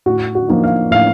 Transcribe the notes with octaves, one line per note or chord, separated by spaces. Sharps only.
A2 F#4
F#4
F3 A#3 D#4
F5
A2 F5